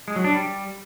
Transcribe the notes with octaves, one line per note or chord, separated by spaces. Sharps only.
G#3
F#3
D4
G3